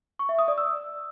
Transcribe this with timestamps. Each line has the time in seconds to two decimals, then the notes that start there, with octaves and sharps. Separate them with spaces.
0.19 C#6
0.29 E5
0.39 D#6
0.48 D5
0.58 E6